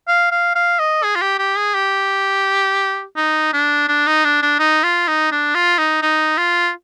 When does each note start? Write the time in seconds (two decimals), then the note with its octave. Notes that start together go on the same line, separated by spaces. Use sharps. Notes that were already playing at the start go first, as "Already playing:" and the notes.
0.08 F5
0.32 F5
0.55 F5
0.79 D#5
1.03 G#4
1.16 F4
1.22 G4
1.38 G4
1.57 G#4
1.75 G4
3.17 D#4
3.54 D4
3.88 D4
4.07 D#4
4.25 D4
4.42 D4
4.59 D#4
4.84 F4
5.08 D#4
5.32 D4
5.55 F4
5.78 D#4
6.02 D#4
6.38 F4